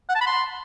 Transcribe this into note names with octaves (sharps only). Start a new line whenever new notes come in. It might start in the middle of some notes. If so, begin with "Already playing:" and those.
F#5
A5
B5
C6